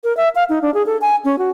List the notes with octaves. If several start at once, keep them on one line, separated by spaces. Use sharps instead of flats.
A#4
E5
F5
D#4
D4
G#4
A4
G#5
C#4
F#4